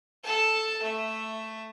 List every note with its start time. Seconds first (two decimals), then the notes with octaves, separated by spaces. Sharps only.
0.24 A4 A5
0.82 A3 E5